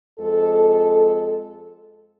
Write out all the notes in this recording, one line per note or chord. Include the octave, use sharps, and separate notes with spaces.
F2 G#3 A4